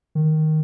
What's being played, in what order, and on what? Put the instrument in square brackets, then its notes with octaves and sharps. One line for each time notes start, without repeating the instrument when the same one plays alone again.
[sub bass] D#3